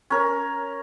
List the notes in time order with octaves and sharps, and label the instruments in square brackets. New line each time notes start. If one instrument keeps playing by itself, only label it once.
[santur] C#4 A#4